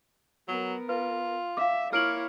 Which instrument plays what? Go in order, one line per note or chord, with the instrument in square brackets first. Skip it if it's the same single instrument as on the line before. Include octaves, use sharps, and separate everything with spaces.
[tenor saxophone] F#3 [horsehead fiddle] B3 A#4
[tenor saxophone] F4 [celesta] B4
[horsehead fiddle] E5 [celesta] F5 D6
[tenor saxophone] A#3 [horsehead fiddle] E4 C#5 [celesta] F6 D7 F#7